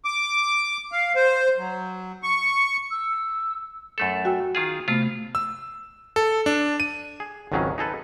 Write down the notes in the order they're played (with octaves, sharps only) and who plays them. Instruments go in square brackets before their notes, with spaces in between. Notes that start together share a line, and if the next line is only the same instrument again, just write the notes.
[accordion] D6
F5
C5
F#3
C#6
[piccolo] E6
[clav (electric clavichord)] F#2 A3 A4
[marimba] F#4 G5 E6
[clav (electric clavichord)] D#3 F4 G#4
[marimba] C3 A3 B3 [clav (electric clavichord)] F4
[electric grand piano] E6
A4
D4
D#7
[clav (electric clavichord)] G#4
G#1 C#2 D#3 F#3 C#4 G#4
D#4 G#4 A4 B4